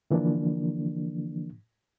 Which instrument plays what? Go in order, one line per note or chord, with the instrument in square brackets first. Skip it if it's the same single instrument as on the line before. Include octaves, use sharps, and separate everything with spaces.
[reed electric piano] D3 E3 F3 A#3 D4